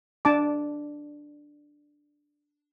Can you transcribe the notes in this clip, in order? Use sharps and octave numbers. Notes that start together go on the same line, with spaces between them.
D4 A5 D6